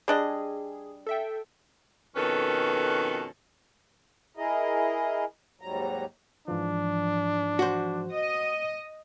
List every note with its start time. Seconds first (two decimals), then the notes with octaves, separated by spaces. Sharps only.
0.08 G3 D4 G#4 D#5
1.07 A4 E5 G5
2.16 F2 B2 D#3 C#4 A4 B4
4.37 E4 G#4 A#4 D#5
5.61 D#2 G#2 F#3 G3 A#5
6.48 G#2 E3 F3 D4
7.59 F#4 C5
8.11 D#5